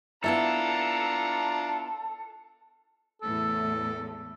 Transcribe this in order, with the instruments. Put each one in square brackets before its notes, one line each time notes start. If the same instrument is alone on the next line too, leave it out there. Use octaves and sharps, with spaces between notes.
[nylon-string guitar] B3 E4 E5 [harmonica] D4 F4 A#5 [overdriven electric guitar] A4
[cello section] E2 A2 A3 [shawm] A4